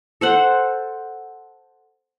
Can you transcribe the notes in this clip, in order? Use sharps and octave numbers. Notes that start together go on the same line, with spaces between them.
A4 C5 F#5